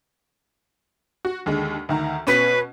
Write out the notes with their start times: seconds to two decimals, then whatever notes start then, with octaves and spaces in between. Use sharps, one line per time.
1.25 F#4
1.46 D#2 D3 G#3
1.89 D2 D#3 A#5
2.27 B2 C#4 B4